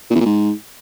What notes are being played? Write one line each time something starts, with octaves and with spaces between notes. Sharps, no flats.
A#2
E2
A#2
G#2